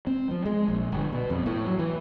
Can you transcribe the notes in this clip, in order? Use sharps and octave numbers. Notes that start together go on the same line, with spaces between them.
C4
F3
G#3
A#1
G1
B2
F2
A2
F#3
E3